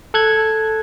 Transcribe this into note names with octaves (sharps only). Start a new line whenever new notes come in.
A4 F#6 G#6